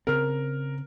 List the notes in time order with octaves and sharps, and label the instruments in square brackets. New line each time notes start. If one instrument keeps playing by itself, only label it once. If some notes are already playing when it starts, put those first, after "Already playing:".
[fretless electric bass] C#3 C4 [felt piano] A#4 F6